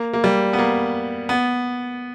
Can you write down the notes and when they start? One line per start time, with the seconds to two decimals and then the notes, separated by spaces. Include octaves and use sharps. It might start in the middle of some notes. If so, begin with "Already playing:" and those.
Already playing: A#3
0.14 A#3
0.24 G3
0.53 B3
0.59 A#3
1.29 B3